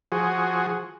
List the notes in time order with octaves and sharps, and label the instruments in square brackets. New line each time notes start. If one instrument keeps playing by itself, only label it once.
[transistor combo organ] F3 F#4 G#4